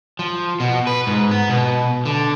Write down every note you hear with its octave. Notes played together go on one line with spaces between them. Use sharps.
F3
B2
B4
G#2
B3
B2
D3